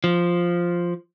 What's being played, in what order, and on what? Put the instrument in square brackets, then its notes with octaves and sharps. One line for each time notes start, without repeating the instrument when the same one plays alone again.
[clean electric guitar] F3